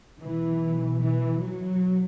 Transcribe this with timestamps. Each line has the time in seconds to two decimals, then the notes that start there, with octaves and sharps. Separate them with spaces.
0.22 B1 B2 E3
1.01 E3
1.40 F#3